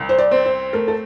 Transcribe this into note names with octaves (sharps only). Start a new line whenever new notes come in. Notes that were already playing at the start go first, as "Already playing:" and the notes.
Already playing: C2
C5
D5
C4
C5
A3 A#4
A4